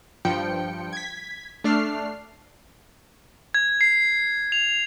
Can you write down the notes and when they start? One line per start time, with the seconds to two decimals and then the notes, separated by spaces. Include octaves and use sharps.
0.25 G2 F3 G5 C#7
0.93 G#6 B6
1.64 A3 D4 F6 C7
3.54 G#6
3.81 C7
4.52 F7